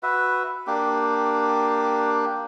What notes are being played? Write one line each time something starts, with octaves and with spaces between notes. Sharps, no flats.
F#4 B4 E5
A#3 D4 G4